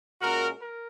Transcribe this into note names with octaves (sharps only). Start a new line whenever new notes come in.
A#2 G#3 C#4 F#4 A#4
A#4